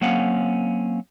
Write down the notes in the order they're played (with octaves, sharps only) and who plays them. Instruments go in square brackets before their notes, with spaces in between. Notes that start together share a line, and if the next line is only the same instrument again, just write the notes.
[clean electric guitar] F#3 A#3 C4 C#4 F5 F#5